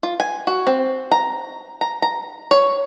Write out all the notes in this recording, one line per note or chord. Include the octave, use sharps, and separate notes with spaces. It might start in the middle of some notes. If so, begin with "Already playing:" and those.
F4
G#5
F#4
C4
A#5
A#5
A#5
C#5